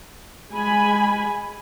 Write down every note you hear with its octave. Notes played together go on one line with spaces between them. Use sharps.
G#3 G#5 B5